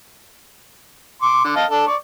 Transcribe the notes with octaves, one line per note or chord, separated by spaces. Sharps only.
C6 D6
D3
D#5 F5 A5
D4 A4
D5 C#6